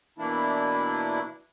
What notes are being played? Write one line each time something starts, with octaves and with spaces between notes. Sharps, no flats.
B2 E3 A#3 D4 E4